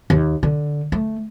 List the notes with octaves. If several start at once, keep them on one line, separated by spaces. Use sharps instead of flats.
D#2
D3
A3